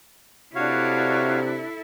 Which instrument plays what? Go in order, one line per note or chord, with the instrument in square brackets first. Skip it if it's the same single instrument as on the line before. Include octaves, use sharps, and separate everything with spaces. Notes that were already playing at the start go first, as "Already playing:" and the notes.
[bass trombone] C3 [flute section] D4 [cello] E4 A4 [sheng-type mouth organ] F#4 C#5 F5